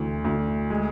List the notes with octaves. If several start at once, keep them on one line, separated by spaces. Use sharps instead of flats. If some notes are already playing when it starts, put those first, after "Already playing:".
Already playing: D2 E3
D2
G#3